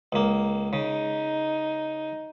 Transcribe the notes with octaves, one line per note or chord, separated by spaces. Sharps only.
C#2 A#3
C#3 D#4